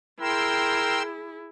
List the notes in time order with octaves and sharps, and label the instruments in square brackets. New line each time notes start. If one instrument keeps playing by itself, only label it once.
[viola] E4 G#4 [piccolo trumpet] A#4 [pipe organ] G5 C6 E6